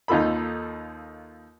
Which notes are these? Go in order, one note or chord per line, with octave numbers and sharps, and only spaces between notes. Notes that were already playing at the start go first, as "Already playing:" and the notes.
D#2 D#4 F4 A4 B5